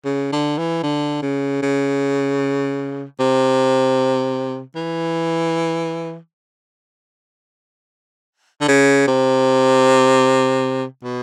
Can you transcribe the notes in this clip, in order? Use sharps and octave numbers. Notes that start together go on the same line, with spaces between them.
C#3
D3
E3
D3
C#3
C#3
C3
E3
D3
C#3
C3
B2